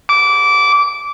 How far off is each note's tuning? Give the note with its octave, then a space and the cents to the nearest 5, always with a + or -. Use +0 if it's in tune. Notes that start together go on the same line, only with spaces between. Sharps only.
D6 -20